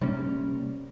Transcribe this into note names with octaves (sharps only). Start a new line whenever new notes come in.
C3 G3 A#3 C#4